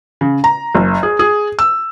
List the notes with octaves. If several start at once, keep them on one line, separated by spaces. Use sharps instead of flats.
C#3
A#5
F#1
G#4
G#4
E6